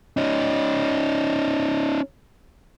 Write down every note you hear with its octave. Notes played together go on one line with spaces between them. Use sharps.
C#4 D#4